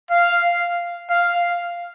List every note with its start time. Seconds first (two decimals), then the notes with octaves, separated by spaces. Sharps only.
0.10 F5
1.10 F5